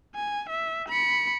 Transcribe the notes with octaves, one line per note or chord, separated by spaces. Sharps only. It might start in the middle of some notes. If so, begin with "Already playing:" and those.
G#5
E5
B5 C#7